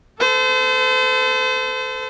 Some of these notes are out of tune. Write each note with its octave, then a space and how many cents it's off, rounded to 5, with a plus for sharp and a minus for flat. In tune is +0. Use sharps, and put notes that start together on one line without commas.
A4 +0 C5 -35